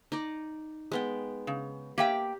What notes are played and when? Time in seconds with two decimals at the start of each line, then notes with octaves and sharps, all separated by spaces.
0.12 D#4 D5
0.92 G#3 B3 G5
1.47 C#3
1.98 A#3 G4 D5 E5 G5